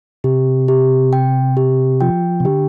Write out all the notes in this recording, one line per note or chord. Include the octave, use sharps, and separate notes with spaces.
C3 G4
G4
G5
G4
F3 G5
C3
D3 G4